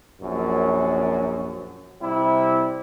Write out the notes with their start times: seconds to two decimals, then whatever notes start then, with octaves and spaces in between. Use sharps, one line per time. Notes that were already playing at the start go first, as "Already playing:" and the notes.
0.21 A#1 F#2
2.01 C3 G3 E4